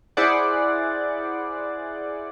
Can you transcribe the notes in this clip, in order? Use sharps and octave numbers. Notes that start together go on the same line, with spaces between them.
E4 G#4 C5 D5 F#5